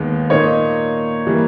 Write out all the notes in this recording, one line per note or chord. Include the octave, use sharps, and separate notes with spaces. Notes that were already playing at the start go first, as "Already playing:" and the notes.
Already playing: D#2 D#3 G#3 B3
A#2 A#3 D#4 C#5
E3 G3 A#3